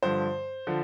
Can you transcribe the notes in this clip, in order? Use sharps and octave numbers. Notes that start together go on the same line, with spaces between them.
G2 D3 F3 C5
D3 F3